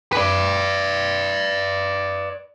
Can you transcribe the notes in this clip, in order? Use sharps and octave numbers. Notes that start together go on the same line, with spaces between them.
B4 D5